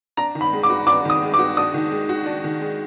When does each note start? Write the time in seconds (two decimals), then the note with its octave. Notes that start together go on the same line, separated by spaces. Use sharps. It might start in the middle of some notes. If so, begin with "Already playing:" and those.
0.17 D4 A#5
0.35 D#3
0.41 B5
0.53 G#3
0.63 D6
0.70 F#4
0.87 D4 D6
1.05 D#3 D#6
1.22 G#3
1.34 D6
1.39 F#4
1.57 D4 D#6
1.74 D#3
1.91 G#3
2.09 F#4
2.26 D4
2.44 D#3
2.61 G#3